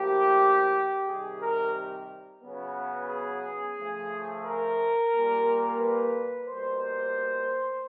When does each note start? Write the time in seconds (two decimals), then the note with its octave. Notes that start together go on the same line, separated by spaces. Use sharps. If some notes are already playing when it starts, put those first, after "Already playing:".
Already playing: A2 F3 A#3 G4
1.06 C3 D#3 G3 G#4
1.41 A#4
2.42 C#3 F#3 B3
3.08 G#4
3.77 C#3 F3 A3
4.43 A#4
5.12 A#2 G3 A#3
5.78 B4
6.46 B2 G3 A#3 C5